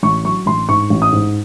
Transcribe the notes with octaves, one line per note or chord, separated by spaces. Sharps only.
A1 C#6
F#3 C#6
A1 C6
G#2 C#6
A1
D#6
G#2